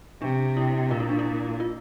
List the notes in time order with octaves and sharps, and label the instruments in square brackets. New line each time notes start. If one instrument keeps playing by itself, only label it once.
[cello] C3 [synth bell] D4
[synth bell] E4
[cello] A#2 [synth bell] F4
[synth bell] E4
D4
E4
F4